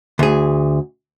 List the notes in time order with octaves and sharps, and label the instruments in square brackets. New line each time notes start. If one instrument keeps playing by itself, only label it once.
[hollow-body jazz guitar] D2 G#4